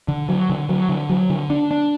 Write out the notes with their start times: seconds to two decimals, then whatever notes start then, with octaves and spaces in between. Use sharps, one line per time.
0.08 D3
0.29 F#3
0.50 D3
0.69 F#3
0.89 D3
1.10 F#3
1.30 D3
1.50 D4
1.71 D4